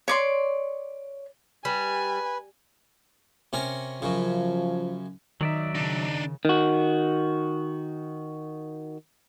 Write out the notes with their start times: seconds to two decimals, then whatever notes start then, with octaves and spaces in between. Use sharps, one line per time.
0.08 C#5 D5 C6
1.65 G3 B4 G#5
3.53 C3 C#4 A#4
4.02 F#2 C#3 F3
5.41 D#3 F#3 D#4 D5 E5
5.75 C#3 D4 D#4
6.45 D#3 F#4